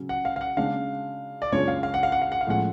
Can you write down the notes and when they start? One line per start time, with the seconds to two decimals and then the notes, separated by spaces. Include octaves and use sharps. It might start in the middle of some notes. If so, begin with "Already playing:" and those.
Already playing: C#3 F#3 C#4
0.09 F#5
0.25 F5
0.36 F5
0.41 F#5
0.57 C#3 G#3 D4 F5
1.42 D5
1.52 F#2 C#3 G#3 D4 F4 C#5
1.68 F5
1.83 F5
1.94 F#5
2.03 F5
2.12 F#5
2.22 F5
2.32 F#5
2.41 F5
2.47 A2 F3 G#3 C#4 F#5